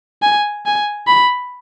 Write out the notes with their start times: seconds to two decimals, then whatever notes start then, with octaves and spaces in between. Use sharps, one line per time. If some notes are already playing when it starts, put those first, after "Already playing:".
0.22 G#5
0.66 G#5
1.07 B5